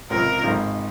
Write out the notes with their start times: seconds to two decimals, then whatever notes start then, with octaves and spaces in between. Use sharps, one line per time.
0.10 C#2 C3 F3 A#4
0.43 G#1 G#2 D#3